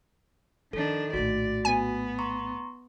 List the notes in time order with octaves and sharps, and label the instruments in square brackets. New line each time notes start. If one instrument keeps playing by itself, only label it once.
[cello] D#3 D4 [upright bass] F3 [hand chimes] A4
[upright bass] A#1 A2 [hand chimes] F#4 [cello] D5
[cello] B3 [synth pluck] G#5
[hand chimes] A#5 C6 C#6